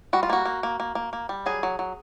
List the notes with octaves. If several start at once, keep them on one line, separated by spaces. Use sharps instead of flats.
G3 F#4
F4
A#3 F#4
A#3
A#3
A#3
A#3
A#3
G3
F#3 G#4
F#3
F#3